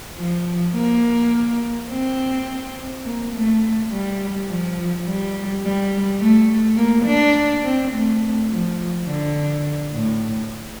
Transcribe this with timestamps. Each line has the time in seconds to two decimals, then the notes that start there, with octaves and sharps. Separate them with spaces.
0.18 F3
0.75 A#3
1.90 C4
3.05 A#3
3.34 A3
3.91 G3
4.48 F3
5.06 G3
5.63 G3
6.20 A3
6.77 A#3
7.06 D4
7.64 C4
7.92 A3
8.50 F3
9.07 D3
9.93 A2